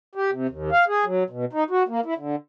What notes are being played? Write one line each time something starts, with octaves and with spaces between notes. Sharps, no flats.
G4
C3
D#2
F5
G#4
F#3
B2
D#4
F#4
A#3
E4
D3